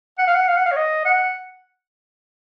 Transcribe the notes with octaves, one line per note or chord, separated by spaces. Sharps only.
F#5
F5
F#5
F5
F#5
F5
C#5
D#5
F#5